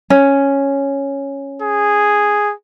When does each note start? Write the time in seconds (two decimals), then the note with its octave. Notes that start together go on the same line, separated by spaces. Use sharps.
0.10 C#4
1.62 G#4